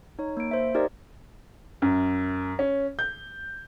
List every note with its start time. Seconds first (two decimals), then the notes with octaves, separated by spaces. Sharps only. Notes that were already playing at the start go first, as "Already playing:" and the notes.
0.19 D#4 C#5
0.37 A#3 D7
0.51 C5 E5
0.74 D#4 G4 A#4 C5 D5 D#5
1.82 F#2
2.59 C#4
2.99 G6